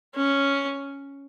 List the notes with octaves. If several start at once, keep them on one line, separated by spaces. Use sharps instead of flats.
C#4